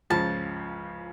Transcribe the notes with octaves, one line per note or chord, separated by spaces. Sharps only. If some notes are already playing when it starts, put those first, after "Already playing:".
C#2 C#3 F3 A5